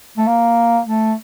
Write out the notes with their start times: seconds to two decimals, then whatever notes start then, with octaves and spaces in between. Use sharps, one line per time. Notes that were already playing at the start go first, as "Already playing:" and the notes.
0.17 A3
0.27 A#3
0.86 A3